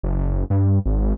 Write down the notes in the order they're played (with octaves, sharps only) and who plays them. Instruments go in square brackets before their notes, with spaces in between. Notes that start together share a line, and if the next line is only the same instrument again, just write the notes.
[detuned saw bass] F#1
G2
G#1